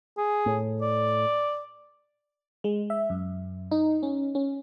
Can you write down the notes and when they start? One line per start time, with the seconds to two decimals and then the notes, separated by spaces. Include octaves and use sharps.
0.17 G#4
0.46 A2
0.82 D5
2.64 G#3
2.90 E5
3.10 F#2
3.71 D#4
4.03 C#4
4.35 C#4